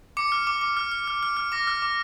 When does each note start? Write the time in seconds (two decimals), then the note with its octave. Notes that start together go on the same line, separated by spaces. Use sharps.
0.17 D6 C#7
0.32 F6
0.47 D6
0.61 D6
0.77 F6
0.92 F6
1.08 F6
1.23 F6
1.37 F6
1.52 D6 A#6
1.67 F6
1.82 D6